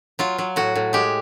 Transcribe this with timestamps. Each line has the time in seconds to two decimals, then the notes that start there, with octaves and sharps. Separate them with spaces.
0.19 F#3 F4
0.38 F#3
0.56 A2 F#4
0.76 A2
0.93 G#3 G4